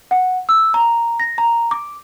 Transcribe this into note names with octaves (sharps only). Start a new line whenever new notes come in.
F#5
E6
A#5
A#6
A#5
D6